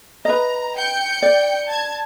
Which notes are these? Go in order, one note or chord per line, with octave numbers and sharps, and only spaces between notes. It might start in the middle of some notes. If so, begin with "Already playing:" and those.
B4 D#5 A#5
G5 G6 C#7
D5
A5 G#6